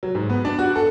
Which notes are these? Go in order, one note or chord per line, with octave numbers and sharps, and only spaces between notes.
F#3
G#2
B3
D4
F#4
A4